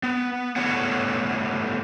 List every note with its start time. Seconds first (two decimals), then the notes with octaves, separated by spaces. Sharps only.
0.03 B3
0.56 A2 D3 B3 F4 C#5 F#5